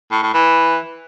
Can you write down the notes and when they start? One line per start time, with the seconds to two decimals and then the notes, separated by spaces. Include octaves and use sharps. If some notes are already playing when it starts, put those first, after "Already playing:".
0.11 A2
0.23 A2
0.34 E3